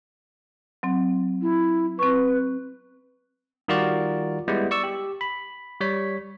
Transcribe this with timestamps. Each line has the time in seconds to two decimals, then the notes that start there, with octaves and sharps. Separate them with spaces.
0.83 F#3 C4
1.42 E4
1.99 C4 B4 C#6
3.68 D#3 G3 F4 F#4 A#4 D5
4.48 G3 G#3 B3 E4
4.71 D5 C#6 E6
4.84 G4
5.21 B5
5.81 G3 C#5 B6